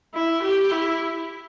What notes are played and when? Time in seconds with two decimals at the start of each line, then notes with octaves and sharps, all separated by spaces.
0.15 E4
0.43 G4
0.71 E4